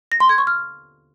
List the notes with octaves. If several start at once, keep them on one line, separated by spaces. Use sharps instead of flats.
A#6
C6
G#6
C#6
F6